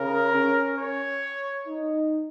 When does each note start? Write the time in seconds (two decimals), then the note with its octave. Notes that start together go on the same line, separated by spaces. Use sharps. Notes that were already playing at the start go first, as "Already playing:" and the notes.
Already playing: C#3 A#4
0.33 C#4
0.78 C#5
1.66 D#4